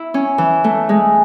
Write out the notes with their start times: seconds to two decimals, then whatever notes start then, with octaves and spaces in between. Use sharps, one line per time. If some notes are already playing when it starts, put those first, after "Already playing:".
Already playing: E4
0.14 C#4
0.38 E3
0.64 A3
0.89 G#3